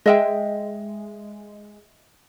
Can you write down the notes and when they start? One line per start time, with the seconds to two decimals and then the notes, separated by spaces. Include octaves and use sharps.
0.06 G#3 D#5 E5 G5